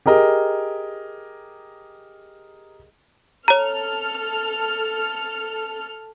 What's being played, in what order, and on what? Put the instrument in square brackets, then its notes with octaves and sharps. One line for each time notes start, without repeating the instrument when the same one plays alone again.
[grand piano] G4 G#4 A#4 D#5
[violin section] A4 F6 [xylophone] C#5 A#5